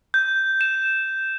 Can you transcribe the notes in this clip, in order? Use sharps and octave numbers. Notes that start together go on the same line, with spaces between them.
G6
E7